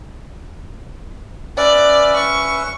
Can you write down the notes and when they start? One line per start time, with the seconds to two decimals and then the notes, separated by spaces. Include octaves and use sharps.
1.57 C#4 B4 D5 E5
2.16 C#6